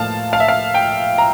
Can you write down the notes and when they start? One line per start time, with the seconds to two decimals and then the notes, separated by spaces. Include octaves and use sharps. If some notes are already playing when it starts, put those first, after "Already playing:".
Already playing: A2 F3 A#3 F5 A5
0.33 F5
0.40 E5
0.48 F5
0.74 G5
1.18 A#5